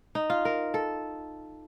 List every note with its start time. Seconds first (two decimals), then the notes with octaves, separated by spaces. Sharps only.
0.15 D#4
0.30 F4
0.45 A#4
0.74 A4